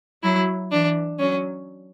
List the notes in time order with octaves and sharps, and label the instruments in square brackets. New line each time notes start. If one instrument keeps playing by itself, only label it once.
[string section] F#3 [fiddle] E4
[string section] E3 [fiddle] D4
[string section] F#3 [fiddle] C#4